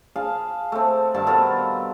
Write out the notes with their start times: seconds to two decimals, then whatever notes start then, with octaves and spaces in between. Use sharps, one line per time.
0.16 G#4 F5 A5
0.72 A3 C4
1.14 G2 D#3 F5 A5
1.27 B2 C4 A4 A#4